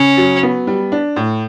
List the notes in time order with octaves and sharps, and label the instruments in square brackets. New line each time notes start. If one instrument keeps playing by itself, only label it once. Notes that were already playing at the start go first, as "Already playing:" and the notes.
Already playing: [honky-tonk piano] C#3 [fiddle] C#4
[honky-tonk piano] F#3
B3
G3
D4
A2